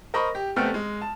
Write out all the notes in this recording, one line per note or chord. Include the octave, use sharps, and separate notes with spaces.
A#4 C5 D#5 B5 C#6
G4
F1 A3 B3 C4 G5 F6
G#3
A5